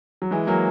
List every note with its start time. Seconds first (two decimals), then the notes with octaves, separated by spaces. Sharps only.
0.22 F#3
0.31 E3 G#3
0.47 F#3 A#3